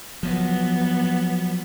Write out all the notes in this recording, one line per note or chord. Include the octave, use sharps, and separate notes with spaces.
F3 F#3 B3